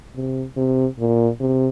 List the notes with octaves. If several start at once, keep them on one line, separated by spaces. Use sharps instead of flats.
C3
C3
A#2
C3